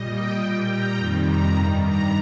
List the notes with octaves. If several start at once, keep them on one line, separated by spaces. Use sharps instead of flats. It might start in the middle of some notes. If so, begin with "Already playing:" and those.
Already playing: A#2 G3 D#5
G5
A#2 G3 G5
A#5
F2 C3 D#3 G3
A#5
G2 D#3 G3
A#5